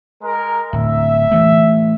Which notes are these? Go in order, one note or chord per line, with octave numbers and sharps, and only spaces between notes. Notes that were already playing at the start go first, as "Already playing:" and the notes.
G#3 A#4
D1 E5
E3 A3